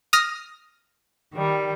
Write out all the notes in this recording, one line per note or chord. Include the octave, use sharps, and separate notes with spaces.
D#6 F6 A#6
D#3 G3